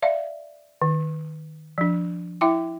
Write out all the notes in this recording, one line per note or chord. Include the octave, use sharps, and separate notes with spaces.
D5 E5 F5
D#3
F3 D4
E4 E5 G5 D6